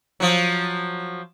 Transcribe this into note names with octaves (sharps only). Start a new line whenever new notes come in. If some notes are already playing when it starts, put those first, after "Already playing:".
F3 F#3